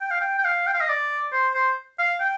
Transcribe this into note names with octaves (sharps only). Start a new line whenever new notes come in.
G5
F5
G5
G5
F5
G5
F5
D#5
D5
C5
C5
F5
G5